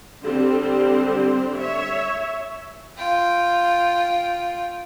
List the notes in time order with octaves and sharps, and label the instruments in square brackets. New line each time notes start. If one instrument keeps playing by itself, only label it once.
[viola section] D3 G3 C4 C5
C#5 E5
[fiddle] F4 G5